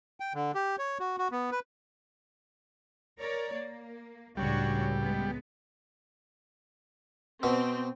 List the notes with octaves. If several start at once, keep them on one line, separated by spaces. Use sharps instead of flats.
G5
D3
G4
C#5
F#4
F#4
B3
B4
A#4 C#5 D5
A#3
C#2 A2 G3 D4 F#4 C#5
G#3 B3
B2 C4